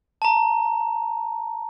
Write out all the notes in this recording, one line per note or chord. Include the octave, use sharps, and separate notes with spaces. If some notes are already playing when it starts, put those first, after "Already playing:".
A5 A#5